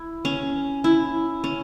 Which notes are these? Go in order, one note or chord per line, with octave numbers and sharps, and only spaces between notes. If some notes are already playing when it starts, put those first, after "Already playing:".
Already playing: E4
C#4
E4
C#4